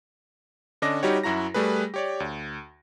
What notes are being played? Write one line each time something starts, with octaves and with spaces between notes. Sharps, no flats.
D3 C#4 D4 D#5 D6 A#6
G3 D#4 F#4 G4 C#5
F#2 E4 F#4 A#5 A#6
G3 A3 G#4 B4
G4 C#5 D5
D2